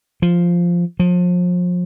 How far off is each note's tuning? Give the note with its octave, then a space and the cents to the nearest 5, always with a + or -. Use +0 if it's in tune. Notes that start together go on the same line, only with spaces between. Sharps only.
F3 -5
F3 +35